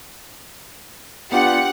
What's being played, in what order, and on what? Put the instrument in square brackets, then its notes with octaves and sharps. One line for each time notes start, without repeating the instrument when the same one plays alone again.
[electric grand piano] B3 D4 F4 [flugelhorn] G4 [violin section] F#5